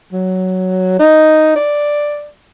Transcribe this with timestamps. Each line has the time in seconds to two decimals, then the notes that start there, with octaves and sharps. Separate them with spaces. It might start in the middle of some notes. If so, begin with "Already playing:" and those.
0.13 F#3
0.99 D#4
1.56 D5